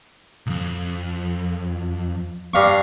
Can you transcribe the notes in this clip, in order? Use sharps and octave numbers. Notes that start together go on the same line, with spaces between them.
B1 F2
G2 F5 C#6